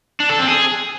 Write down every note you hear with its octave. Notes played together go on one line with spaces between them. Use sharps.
D4
A4
C4
G#4